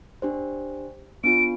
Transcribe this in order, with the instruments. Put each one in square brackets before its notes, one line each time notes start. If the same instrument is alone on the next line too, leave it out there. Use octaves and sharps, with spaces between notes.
[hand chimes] D4 G4 C5
[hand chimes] B3 D4 F4 [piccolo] D7